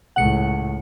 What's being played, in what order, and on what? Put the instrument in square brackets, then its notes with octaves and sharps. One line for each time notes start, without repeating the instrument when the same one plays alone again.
[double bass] C#2 A2 [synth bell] F#5 C#7